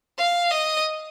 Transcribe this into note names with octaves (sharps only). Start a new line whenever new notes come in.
F5
D#5